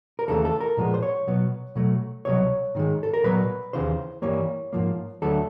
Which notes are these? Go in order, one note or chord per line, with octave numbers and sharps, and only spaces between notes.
A#4
D#2 C#3 E3 A3 A4
A4
A#4
A#2 F3 G#3 B3
C5
C#5
B2 F#3 B3
B2 F#3 A3
C2 B2 F#3 C#5
G#2 D#3 G#3
A4
A#4
A#2 F#3 B3 B4
D#2 C#3 E3 C5
G2 E3 G3 A#3 C#5
G#2 F3 A#3
D2 D3 F#3 A3 A4